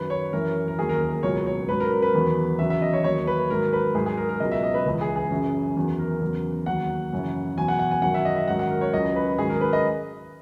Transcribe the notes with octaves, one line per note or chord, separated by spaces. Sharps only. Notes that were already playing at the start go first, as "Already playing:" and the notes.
Already playing: F#2 D#3 F#3 B4
C#5
F#2 E3 A#4
A#4
D#2 D#3 F#3 G#4
A#4
A#4
A#4
C#2 B2 F#3 C#5
C#5
G#2 F#3 B4
A#4
A#4
B4
E2 D#3 F#3
E2 C#3 F#3 E5
E5
D#5
C#5
D#2 D#3 F#3 C#5
B4
G#2 D#3 F#3 A#4
B4
G#2 F#3 G#4
G#4
A#4
A#4
C#2 B2 F#3 D#5
E5
D#5
B4
C#2 C#3 E3
G#4
G#4
F#2 C#3 E3
E2 D#3 F#3
A#4
E2 C#3 F#3
D#2 D#3 F#3 F#5
F#2 C#3 E3
E2 B2 F#3 G#5
F#5
F#5
G#5
F#2 D#3 F#3 F#5
E5
D#5
E5
G#2 D#3 F#3 F#5
F#5
A#4
C#5
C#2 C#3 F#3 D#5
B4
G#2 D#3 F#3 G#4
A#4
B4
D#5